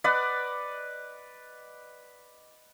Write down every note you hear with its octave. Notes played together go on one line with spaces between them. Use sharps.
B4 D5 D#5 F#5